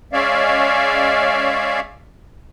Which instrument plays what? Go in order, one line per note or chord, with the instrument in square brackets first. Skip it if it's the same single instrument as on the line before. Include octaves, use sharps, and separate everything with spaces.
[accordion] G#3 C#4 C#5 D5 E5 F5